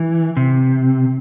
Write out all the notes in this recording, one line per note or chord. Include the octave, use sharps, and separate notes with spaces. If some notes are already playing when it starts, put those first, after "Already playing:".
Already playing: E3
C3